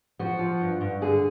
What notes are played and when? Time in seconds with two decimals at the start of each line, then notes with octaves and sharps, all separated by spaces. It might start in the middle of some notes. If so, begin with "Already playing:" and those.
0.19 F3 F#4
0.39 F3
0.61 G2
0.81 G2
1.01 D3 G#4